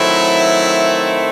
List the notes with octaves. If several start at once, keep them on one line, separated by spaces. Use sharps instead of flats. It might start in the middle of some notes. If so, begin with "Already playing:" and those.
Already playing: D#3 F#3 A3 C4 E4